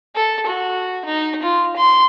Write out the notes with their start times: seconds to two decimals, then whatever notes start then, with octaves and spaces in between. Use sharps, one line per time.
0.16 A4
0.47 F#4
1.05 D#4
1.43 F4
1.76 C6